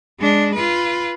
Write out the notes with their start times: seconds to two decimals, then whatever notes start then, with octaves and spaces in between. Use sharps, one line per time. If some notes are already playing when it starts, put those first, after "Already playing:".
0.20 G#3 D4
0.55 F4 B4